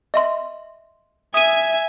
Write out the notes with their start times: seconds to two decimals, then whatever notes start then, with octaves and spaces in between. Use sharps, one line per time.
0.14 D#5 E5 C6
1.34 E5 G#5 D#6 D#7